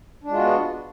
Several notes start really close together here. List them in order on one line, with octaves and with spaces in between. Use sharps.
D4 G#3 F4 F#4 B3